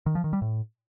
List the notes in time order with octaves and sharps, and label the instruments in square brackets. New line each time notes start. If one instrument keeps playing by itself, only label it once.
[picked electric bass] D#3
F3
D#3
G3
A2